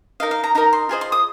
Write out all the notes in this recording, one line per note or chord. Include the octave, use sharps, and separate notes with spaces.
D#4 A#4 D#5 F5
F5
A#5
D#4 A#4 D#5 A#5
C6
F4 G#4 C5 D#5
C6
D#6